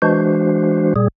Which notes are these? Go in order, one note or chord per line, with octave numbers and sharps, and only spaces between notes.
E3 G#3 D4 F#4 C5
A#2 G3 G#4